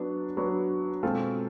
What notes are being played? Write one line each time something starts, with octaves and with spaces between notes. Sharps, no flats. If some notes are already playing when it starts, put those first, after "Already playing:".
Already playing: F#3 B3 D4
F#3 B3 D4
B2 G#3 C4 F4 A4